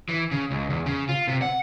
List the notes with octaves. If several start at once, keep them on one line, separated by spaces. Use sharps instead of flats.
E3
C#3
C#2
E2
C#3
F4
C3
F#5